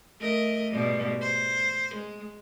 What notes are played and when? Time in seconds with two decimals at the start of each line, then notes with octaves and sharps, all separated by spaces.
0.20 A3 A#4 D#5
0.71 G#2 B2 G3
1.21 C5
1.96 G#3